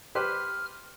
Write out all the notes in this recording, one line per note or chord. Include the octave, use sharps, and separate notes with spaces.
G4 B4 C5 F6